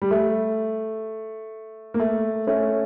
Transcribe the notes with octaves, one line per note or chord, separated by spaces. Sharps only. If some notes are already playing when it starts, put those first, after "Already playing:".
G3
A3
A#3
A3
A3 C#4